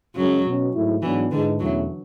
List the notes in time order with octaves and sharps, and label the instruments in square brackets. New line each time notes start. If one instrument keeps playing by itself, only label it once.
[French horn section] F#2 C#3 G#3 C#4 [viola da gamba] F#3
[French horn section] B2 F#3 C#4
G#2 F#3 A3 E4
[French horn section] G#2 F#3 B3 D4 F#4 [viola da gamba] E3
[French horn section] G#2 E3 G#3 [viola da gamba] D3
[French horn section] E2 B2 A3 C#4 E4 [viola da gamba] F#3